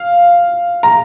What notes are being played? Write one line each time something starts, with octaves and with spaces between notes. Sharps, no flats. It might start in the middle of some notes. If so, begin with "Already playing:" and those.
Already playing: F5
A#5